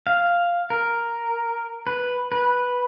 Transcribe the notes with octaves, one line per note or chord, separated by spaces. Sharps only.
F5
A#4
B4
B4